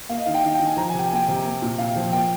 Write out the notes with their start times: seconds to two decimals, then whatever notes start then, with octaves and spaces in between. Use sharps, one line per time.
0.09 A#3 F5
0.18 D#5
0.26 D#3 F5
0.34 G5
0.43 D#3 F5
0.55 G5
0.60 D#3
0.66 G#5
0.77 F3 A#5
0.89 G#5
0.94 C3
0.99 G5
1.07 G#5
1.12 A#3 G5
1.28 C3
1.45 A#3
1.62 A#2
1.78 A#2 F5
1.96 F3
2.12 A#3 G5